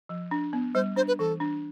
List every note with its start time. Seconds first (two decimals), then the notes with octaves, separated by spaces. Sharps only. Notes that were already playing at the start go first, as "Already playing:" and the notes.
0.09 F3
0.31 D4
0.53 B3
0.75 G3 C5
0.96 D4 C5
1.08 B4
1.19 E3 A4
1.40 D4